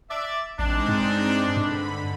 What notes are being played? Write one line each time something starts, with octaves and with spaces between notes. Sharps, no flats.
D5 E5
A1 G#3 C4 D4 D#4
G2
G2 D3 B5